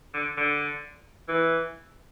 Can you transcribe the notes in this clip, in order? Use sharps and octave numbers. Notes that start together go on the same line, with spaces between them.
D3
D3
E3